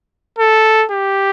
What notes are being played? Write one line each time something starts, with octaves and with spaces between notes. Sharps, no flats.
A4
G4